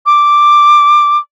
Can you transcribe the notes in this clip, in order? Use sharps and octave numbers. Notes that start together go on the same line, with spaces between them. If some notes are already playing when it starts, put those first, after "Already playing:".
D6